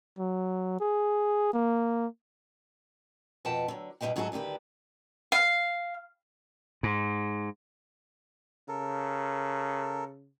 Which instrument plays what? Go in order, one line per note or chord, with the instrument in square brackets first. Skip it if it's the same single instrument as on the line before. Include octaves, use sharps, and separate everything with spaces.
[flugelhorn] F#3
G#4
A#3
[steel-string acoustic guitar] F2 B2 B4 F#5 G5 A5
D3 F#3
G2 B2 A3 D#4 B4 G5
D2 G#2 F#3 F#4 G#4 A4
D2 D3 D#3 G4 B4
[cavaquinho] F5
[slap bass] G#2
[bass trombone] C#3 [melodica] A4 A#4